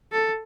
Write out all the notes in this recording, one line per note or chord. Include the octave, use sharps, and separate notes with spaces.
A4